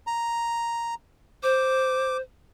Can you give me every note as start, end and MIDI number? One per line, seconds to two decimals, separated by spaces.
0.07 0.94 82
1.43 2.21 72
1.43 2.17 86